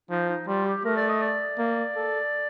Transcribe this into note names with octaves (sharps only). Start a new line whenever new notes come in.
F3 D#4
D#4
G3 F4
G4
A3 A#4
D5
D#5
D5
A#3
A4